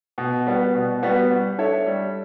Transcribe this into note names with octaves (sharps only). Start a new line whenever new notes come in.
B2
G3 B3 F#4
B2
G3 B3 F#4
G3
D4 A4 C#5 E5
G3